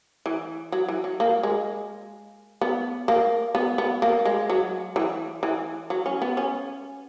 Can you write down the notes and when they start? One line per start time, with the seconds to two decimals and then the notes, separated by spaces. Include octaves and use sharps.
0.26 E3
0.72 F#3
0.89 E3
1.04 F#3
1.20 A#3
1.43 G#3
2.61 B3
3.08 A#3
3.55 B3
3.78 B3
4.02 A#3
4.25 G#3
4.50 F#3
4.96 E3
5.43 E3
5.90 F#3
6.06 C#4
6.22 B3
6.37 C#4